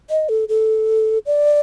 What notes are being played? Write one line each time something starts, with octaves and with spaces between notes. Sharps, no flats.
D#5
A4
A4
D5